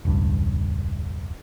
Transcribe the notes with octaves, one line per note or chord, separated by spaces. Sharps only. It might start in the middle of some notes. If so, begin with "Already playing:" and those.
E1 C#2 G2